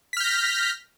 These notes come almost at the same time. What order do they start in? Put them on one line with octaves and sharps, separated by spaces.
B6 F6 G6 A#6